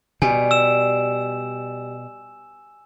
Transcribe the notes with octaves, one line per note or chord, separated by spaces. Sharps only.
B2 G3 G#5
E6 E7